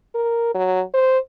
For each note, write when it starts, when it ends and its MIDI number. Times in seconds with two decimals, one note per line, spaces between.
0.15 0.50 70
0.54 0.82 54
0.94 1.19 72